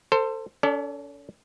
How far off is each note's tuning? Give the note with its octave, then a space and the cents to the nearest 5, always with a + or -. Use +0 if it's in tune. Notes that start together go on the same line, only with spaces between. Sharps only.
A4 +30 C5 +0
C#4 +40 A4 +15 D5 +0